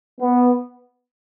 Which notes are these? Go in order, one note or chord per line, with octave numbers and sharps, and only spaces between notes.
B3